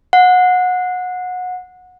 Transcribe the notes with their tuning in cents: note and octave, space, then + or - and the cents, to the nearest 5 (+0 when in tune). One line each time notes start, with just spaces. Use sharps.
F#5 -25